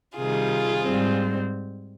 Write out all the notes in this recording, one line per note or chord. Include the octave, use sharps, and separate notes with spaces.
C3 D#3 G3 F4 G#4
G#2 G3 C4